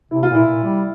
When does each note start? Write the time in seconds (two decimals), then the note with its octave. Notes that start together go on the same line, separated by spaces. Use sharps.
0.11 C3 E4
0.23 F4
0.29 A#2
0.35 E4
0.46 A#2
0.63 G3